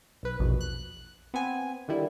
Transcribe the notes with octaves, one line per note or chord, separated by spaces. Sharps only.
B1 B4
A#1 E2 B2
F#6
B3 C4 G#5
D3 D#3 G3 E4